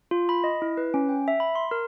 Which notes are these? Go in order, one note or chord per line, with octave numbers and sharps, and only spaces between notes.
F4
B5
D#5
E4
B4
C#4
G5
E5
B5
C6
A#4